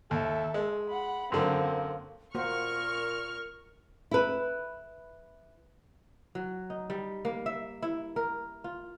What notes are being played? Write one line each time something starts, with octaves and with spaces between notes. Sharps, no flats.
D#2 A4 E5
G#3
F#5 B5
F#2 D3 A#3 C4
A#2 A#3 F#4 A#4 C5 C#6 F6
E4 B4
F#3
D#4
G3
A#3
E5
E4
A#4
F4